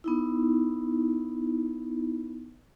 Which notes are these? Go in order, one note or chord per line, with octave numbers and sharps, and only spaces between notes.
B3 D#4 E4